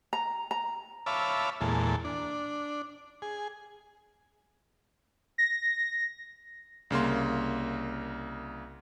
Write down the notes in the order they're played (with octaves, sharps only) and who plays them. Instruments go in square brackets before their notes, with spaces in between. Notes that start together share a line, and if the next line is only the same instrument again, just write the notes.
[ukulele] A#5
A#5
[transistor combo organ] C#5 E5 F5 A5 B5 D6
E2 A#2 G#3 A4
D4
G#4
[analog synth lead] A#6
[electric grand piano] C2 C#3 A#3 C6